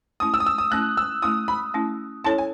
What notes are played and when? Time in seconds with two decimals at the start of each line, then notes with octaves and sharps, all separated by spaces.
0.20 A3 C#4 E4 D#6
0.34 E6
0.40 D#6
0.46 E6
0.58 D#6
0.71 A3 C#4 E4 F#6
0.97 E6
1.22 A3 C#4 E4 D#6
1.48 B5
1.74 A3 C#4 E4
2.24 C#4 E4 A4 C#5 A5
2.38 G#5